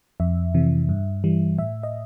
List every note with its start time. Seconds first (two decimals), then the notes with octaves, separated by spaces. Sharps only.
0.20 F2 E5
0.54 C3 E3
0.89 G2
1.24 E3 G3
1.58 A2 E5
1.83 D#5